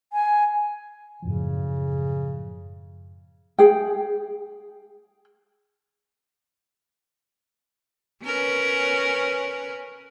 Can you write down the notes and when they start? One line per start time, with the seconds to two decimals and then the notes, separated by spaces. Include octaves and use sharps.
0.13 G#5
1.22 F#2 A2 C#3 F3
3.59 G#4 G5
8.24 C#4 A#4 B4